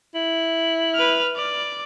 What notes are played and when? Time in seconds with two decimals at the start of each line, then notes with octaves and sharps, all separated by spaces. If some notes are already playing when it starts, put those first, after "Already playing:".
0.15 E4
0.94 B4 F6
1.36 D5